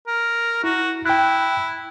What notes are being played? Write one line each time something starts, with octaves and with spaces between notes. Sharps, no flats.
A#4
E4 F#4
E4 G5 F#6